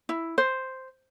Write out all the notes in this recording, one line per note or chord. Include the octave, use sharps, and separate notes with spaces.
E4
C5